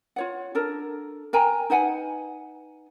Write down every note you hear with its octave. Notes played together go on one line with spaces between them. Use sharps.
F4 C#5 F#5
D4 A4 A#4
A#4 G5 G#5 A#5
D#4 B4 F#5 G#5